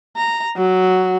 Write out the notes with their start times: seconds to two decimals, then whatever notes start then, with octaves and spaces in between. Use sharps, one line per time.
0.17 A#5
0.56 F#3